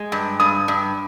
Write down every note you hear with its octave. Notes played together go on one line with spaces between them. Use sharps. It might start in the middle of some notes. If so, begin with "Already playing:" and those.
Already playing: G#3
G2
G2 D#6
G2